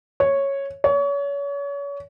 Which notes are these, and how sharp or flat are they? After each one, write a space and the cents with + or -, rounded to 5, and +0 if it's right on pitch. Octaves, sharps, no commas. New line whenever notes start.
C#5 -5
C#5 +35